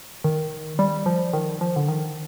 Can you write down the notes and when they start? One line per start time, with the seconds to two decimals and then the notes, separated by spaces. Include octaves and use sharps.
0.24 D#3
0.79 G3
1.06 F3
1.33 D#3
1.61 F3
1.76 D3
1.88 D#3